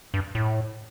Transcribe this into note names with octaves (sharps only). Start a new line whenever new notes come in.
G2
A2